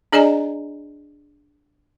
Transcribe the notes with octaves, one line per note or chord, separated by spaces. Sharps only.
D4 G#4 D5 D#5 G#5 A#5